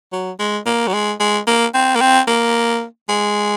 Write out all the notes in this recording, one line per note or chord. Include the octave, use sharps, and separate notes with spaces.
F#3
G#3
A#3
F#3
G#3
G#3
A#3
C4
A#3
C4
A#3
G#3